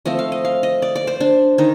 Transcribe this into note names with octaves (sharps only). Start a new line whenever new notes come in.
F3 A3 C4 D#5
F5
D#5
F5
D#5
D5
D5
C5
D4
D#3 D#4